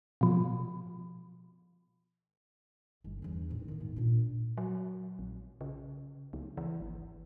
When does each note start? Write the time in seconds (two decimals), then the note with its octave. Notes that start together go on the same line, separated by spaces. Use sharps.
0.21 B2 F3
3.04 G1 G3
3.22 E2 D4
3.49 A2 C4
3.68 D#3 B3
3.80 G#2 B3
3.96 A#2 D4
4.57 F#3
5.19 A#1
5.61 C#3
6.33 C#2
6.57 E3
6.81 G#1